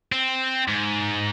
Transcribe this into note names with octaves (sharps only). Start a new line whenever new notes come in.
C4
G#2